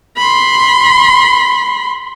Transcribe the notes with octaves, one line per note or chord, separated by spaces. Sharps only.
B5 C6